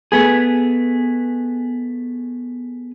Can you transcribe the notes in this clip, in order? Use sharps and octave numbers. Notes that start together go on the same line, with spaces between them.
A3 B3 G#4